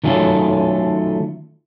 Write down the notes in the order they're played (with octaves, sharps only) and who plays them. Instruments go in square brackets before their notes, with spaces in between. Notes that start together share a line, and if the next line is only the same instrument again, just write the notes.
[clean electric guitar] D#3 F#3 A3 C#4 F4 A4